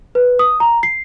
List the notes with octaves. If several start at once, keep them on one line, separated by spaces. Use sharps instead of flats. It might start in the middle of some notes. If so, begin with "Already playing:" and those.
B4
D#6
A#5
C7